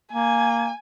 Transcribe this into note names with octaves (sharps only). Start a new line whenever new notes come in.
A#3 G#5